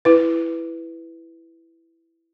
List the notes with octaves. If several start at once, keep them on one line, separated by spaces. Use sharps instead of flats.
E4 B4